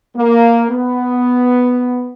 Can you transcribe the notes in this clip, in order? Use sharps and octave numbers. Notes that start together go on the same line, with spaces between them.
A#3
B3